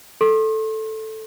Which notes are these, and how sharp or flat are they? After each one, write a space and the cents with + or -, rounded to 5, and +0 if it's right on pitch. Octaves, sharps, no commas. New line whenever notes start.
A4 +0 C6 +40